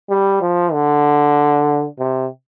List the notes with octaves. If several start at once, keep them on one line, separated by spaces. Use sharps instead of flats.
G3
F3
D3
C3